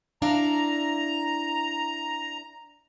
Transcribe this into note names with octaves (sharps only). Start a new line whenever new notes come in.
D4 E4 F5 A#5